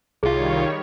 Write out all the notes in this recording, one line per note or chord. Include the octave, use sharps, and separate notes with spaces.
C2 D#3 G3 F4 G#4 C#5 F5